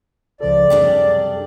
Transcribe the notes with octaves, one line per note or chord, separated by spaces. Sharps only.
C#2 C#3 F3 A4 D5
F#2 C3 G3 D4 G#4 A4 G5